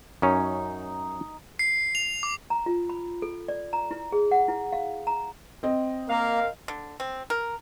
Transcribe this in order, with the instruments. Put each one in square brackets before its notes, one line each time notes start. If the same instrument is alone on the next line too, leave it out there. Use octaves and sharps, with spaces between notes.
[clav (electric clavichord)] F#2 C#4 C#5 [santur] D#4
[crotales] C7
F7
D6
[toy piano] A#5
F4
B5
A4
D5
A#5
E4
G#4
F#5
E4
F5
A#5
[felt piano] C4 D#5
[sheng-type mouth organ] A#3 [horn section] A#4 F5
[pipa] D3
C4
A#4